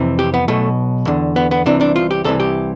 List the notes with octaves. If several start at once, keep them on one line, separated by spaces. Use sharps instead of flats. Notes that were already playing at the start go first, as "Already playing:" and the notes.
Already playing: F2 C3 E3
G4
B3
B1 B2 A3
E2 D3
B3
B3
C2 C3 E3 D4
D4
F4
G4
C2 C3 E3 A4
G4